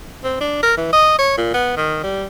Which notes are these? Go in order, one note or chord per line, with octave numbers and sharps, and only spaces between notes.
C4
D4
A#4
E3
D#5
C#5
A#2
B3
D#3
G3